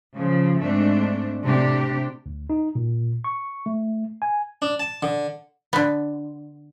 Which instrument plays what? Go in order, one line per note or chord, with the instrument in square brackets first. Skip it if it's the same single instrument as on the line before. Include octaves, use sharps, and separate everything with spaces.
[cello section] C#3 F3
G#2 A3 C4 D4
A2 C3 A3 D4 G4
[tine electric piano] D2
D#4
A#2
C#6
A3
G#5
[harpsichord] D4
A5
D3
[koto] D3 B3